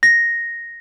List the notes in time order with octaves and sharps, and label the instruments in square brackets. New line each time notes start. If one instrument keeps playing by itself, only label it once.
[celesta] A#6